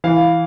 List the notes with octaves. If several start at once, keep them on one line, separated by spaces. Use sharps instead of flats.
E3 F5